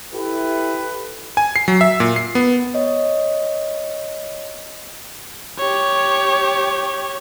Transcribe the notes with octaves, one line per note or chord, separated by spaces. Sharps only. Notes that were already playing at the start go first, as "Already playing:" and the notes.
E4 G4 A4 B4
G#5
C7
F#3
E5
A#2
C7
B3
C#5 D#5
G4 C#5